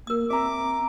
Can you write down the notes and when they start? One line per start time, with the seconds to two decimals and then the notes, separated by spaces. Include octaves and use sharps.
0.07 A#3 A#4 D#6
0.30 C4 E5 A#5 D6